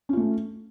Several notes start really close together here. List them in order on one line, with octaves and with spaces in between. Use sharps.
C#4 F4 A3